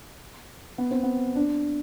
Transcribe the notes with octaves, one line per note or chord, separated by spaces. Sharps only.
B3
C4
B3
D4